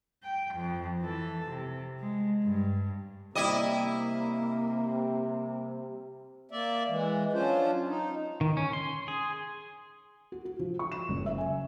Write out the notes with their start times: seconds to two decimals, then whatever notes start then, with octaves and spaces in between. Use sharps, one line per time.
0.23 G5
0.54 F2
1.01 E3 A4
1.49 C3
1.99 G#3
2.43 G2
3.35 C3 G3 A#3 E4 D#5 E5
6.50 A#3 D5 E5
6.89 E3 G#3
7.33 F#3 C#4 D4 F4 C5
7.88 D#4
8.41 D#3
8.57 C#4
8.73 C6
9.08 G#4
10.32 F#4
10.45 F#4
10.59 F3
10.79 C#6
10.92 E7
11.09 F#1
11.26 E5
11.38 G#5